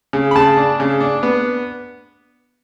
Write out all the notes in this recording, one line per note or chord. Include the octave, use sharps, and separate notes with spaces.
C#3
B5
C#3 A5
D4
C#3
D4
B3